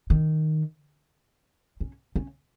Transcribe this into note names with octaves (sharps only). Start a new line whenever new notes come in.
D#3
C#4
C#4